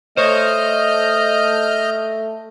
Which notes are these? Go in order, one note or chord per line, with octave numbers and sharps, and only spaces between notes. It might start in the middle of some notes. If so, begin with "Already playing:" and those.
A3 C5 C#5 D#5 F6 G6